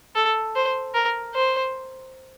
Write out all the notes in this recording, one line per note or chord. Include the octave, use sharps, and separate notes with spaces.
A4
C5
A#4
C5